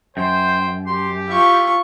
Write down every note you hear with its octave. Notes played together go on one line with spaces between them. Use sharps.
F#2 C5 G5
G4 C6
E4 F4 C#6